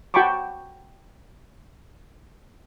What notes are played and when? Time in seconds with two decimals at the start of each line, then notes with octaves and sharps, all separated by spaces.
0.14 F#4 G5 A5 B5 C#6 D6